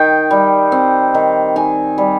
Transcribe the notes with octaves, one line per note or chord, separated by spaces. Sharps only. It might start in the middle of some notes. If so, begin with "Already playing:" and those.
Already playing: D#3 G5
G3
C4
D#3
D#3 G#5
G3